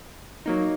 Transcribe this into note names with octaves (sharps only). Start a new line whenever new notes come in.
F#3 A#3 D#4